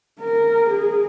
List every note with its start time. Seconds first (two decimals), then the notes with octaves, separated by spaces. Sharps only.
0.21 A#4
0.70 G#4